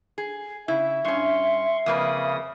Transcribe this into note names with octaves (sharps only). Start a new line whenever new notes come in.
G#4
C#3 E4 E5
G2 C#4 C6 C#6
F2 C#3 A#3 B4 D#6